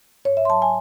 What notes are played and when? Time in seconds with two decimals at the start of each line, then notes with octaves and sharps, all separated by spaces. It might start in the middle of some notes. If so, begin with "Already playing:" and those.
0.25 G#2 C#5
0.37 E5
0.45 C6
0.49 F#3 A5
0.62 G#5